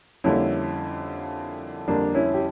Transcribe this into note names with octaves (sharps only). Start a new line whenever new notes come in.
F2 D3 G3 A#3 C#4 E4
F2 D3 G3 A#3 D4
C#4 E4
G4